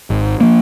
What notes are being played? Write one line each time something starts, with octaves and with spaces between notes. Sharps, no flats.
G#1
F3 A#3